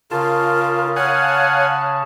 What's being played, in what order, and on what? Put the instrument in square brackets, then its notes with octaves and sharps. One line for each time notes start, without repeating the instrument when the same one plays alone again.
[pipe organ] C#3 A5 [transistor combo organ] F4 [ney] A#4
[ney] C#5 [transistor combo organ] F5 F#5 G#5